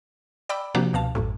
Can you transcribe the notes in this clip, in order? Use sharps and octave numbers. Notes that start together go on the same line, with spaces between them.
D5 G5 B5 D6 E6
C3 F3 A#3 D4 F#4 G4
C#2 B2 F5 A5
A1 F#2 A2